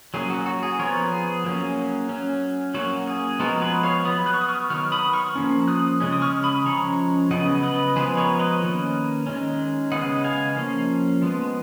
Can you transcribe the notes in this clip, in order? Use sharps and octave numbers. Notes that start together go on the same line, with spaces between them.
F#3 A#3 C#4 G#4
F#4
F#4
G#4
F3 B3 A#4 C#5
G#4
F#3 A#3 C#4
F#3 C#4
F#3 A#3 C#4 F#4
G#4
F3 G#3 B3 F#4 A#4
G#4 B4
C#5 F5
F#3 B3 B5 D#6
D#6 F#6
C#6
D#6
C#6 F6
D#3 F#3 B3 C#6 F6
B5 D#6
C#6 F6
F3 A#3 C#4
D#6 F#6
C#3 G#3 C#4
D#6
C#6 F6
B5 D#6
F3 G#3 C#4 A#5 C#6
C#3 F#3 B3 D#5 F#5
B4 D#5
F3 G#3 B3 G#4 B4
A#4 C#5
B4 D#5
D#3 A#3 C#4
D#3 G#3 C#4
C#3 G#3 B3 D#5 F#5
F5 G#5
F3 A#3 C#4
F3 G#3 B3